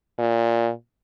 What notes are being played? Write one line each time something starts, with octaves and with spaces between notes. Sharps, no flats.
A#2